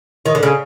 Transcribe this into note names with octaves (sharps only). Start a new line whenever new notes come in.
D#3
D3
C#3